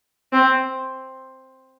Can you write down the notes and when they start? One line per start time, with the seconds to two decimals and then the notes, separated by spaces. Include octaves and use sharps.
0.33 C4